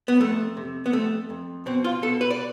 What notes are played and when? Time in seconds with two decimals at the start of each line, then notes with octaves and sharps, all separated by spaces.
0.08 B3
0.20 F2 A3
0.57 C3
0.86 B3
0.93 F2 A3
1.30 F2
1.66 B2 C4
1.84 F4
2.02 B2 A4
2.21 B4
2.30 D5